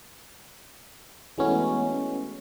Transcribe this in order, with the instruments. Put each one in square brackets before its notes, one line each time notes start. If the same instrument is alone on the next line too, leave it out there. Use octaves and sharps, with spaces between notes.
[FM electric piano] E3 G#3 A3 B3 C#4 F#4